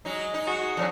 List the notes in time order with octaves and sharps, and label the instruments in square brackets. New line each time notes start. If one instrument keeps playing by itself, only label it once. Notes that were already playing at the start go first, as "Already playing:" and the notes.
[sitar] F#3 D#4 [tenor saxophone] G#3
[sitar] D#4
[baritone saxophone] F#4 [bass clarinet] G#4
[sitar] F2 C3 F#3 [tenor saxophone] D4